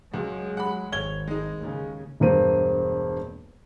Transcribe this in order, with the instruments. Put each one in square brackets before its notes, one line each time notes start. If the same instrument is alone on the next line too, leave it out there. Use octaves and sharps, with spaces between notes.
[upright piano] C#2 [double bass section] F#3 G#3
[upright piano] F#5 B5
[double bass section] G#1 [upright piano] C#5 G#6 G7
[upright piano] G#3 D#4
[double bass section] D#2 C#3
[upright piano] E1 G2 A#3 C4 D#7